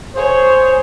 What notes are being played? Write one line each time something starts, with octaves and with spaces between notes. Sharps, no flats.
G#4 C5 C#5